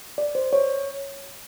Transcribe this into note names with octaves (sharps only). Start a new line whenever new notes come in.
D5
C5
C#5